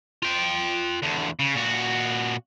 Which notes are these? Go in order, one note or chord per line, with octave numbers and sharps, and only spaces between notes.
F4 G5
E2 D3
C#3
A#2 F#4